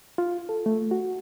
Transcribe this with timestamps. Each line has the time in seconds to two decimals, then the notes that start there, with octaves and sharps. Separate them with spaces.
0.18 F4
0.49 A4
0.66 A3
0.91 F#4